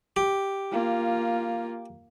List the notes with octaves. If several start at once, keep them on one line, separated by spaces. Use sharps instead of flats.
G4
A#3 F4